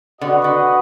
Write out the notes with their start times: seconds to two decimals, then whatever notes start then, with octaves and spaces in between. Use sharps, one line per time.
0.21 D3 F#4 B4 D#5 F#5
0.44 D3